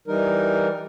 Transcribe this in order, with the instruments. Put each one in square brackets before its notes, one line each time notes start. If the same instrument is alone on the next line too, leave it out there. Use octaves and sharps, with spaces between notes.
[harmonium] E3 G3 D#4 A#4